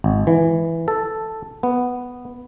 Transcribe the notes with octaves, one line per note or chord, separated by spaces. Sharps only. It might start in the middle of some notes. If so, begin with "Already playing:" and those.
G#1
E3
A4
B3